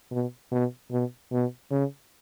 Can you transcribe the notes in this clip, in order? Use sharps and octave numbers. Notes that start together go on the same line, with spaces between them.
B2
B2
B2
B2
C#3